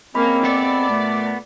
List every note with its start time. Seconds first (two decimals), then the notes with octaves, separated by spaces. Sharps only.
0.15 F3 G#3 A#3 C4 C#4 B5
0.45 B3 A4 D5
0.89 A#2 A3